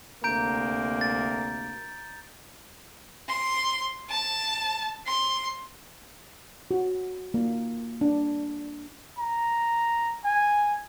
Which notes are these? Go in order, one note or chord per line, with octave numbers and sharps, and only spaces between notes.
D2 C3 A#3 A#5 G6 D7
A6
C6
A5
C6
F#4
A#3
D4
A#5
G#5